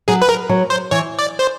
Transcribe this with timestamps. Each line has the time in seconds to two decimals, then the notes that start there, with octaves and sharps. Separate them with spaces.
0.08 F#3 G#4
0.22 B4
0.29 A#4
0.49 F#3
0.70 C5
0.91 E3 C#5
1.19 D5
1.39 C5